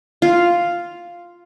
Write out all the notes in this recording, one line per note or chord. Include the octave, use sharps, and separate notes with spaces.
F4